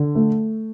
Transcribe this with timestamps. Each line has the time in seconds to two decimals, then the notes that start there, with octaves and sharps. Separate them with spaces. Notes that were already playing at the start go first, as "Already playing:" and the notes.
Already playing: D3
0.15 A3